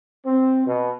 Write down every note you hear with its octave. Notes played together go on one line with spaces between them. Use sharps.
C4
B2